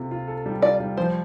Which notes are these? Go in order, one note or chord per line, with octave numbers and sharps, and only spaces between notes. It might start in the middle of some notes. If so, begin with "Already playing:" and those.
Already playing: C3 F4 A4
F4
A4
G3
F4 D5
G3
F3 C5